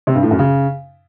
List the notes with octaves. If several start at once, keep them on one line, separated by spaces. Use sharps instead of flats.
C3
G2
A2
F#2
C#3